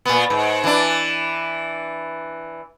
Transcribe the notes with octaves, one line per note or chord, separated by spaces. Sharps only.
A#2 B3
G#2
E3 D4